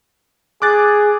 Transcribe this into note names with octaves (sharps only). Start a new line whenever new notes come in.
G#4 D6 F#6 A6